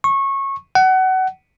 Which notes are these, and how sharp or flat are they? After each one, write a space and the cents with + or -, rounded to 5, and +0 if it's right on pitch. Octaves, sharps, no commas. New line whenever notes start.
C#6 -20
F#5 +25